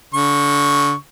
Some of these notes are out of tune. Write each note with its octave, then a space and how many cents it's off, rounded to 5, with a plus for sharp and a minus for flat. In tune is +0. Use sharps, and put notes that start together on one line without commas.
D3 -30 C#6 -5